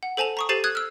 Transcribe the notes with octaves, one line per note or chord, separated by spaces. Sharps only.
F#5
A4 C5 G#5 A5 F7
A#5 C#6 D#6
G4 A4 C5 A6 C7 D#7
D#6 F#6 G#6
E6 F6